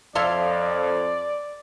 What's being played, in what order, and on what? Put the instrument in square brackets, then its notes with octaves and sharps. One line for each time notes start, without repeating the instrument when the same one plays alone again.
[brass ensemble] F2 [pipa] A4 E5 F5 [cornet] D5 [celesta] C6 G#6 F7